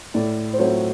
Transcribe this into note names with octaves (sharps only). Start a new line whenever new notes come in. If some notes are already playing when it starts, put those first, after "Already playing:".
A2 D5
C5
F#3 A3 C4 C#5